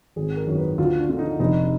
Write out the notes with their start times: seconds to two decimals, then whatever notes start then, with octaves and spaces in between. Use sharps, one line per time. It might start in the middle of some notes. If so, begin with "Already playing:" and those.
0.16 G#1 G#4
0.37 A#4
0.47 F#2 D#3
0.58 B4
0.78 D2 F4
0.99 D4
1.10 D3 F4
1.19 D#4
1.39 F1 D#4